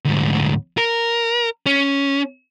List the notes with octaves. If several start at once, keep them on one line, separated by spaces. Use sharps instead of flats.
D2 G#2
A#4
C#4